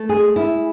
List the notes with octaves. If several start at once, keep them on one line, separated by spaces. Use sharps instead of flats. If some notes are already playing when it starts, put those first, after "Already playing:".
Already playing: A3
G#4
E4